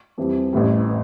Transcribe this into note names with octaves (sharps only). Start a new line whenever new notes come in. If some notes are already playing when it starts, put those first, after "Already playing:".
F2 E3 G3
A1 A2 E3 G3